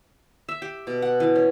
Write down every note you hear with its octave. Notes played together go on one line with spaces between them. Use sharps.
E5
G4
B2
F#5
E3
C#4